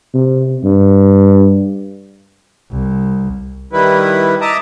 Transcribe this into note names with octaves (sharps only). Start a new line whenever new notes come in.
C3
G2
C2
D#3 G3 E4 B4
D#5 E5 A5 A#5 D6 D#6